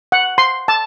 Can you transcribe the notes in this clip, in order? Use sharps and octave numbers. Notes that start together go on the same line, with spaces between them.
F#5
C6
A5